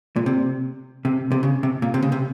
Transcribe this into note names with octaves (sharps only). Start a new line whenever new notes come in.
A#2
C3
C3
C3
C#3
C3
A#2
C3
C#3
C3